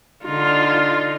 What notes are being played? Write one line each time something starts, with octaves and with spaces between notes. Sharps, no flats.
D3 D#4 F4